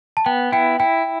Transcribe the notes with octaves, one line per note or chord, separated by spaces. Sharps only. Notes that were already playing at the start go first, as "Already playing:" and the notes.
A5
B3 G5
E4 G5
E4 G5